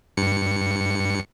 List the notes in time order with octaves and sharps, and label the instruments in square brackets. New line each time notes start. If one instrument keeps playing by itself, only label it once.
[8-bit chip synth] G2 C#7